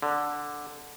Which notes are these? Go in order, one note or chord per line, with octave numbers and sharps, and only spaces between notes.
D3